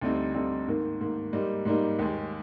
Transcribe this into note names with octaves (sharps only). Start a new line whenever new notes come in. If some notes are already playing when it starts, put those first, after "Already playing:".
D2 D3 G3 C4 D#4
D2 D3 G3 C4 D#4
G#2 D#3 A#3
G#2 D#3 A#3
G#2 G3 A#3 D#4
G#2 G3 A#3 D#4
D#2 D#3 G#3